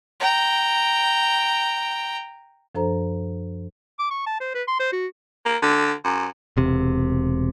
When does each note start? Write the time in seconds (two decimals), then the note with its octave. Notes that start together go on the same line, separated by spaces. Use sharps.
0.20 G5 A#5
2.75 F#2 F3 D4 A4 C5 A#5
3.99 D6
4.11 C#6
4.26 A5
4.41 C5
4.54 B4
4.68 C6
4.80 C5
4.93 F#4
5.45 A#3
5.62 D3
6.04 F#2
6.57 E1 C3